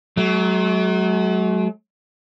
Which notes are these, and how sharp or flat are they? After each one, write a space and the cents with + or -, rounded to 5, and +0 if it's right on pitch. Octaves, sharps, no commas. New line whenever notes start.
F#3 +15 A3 -45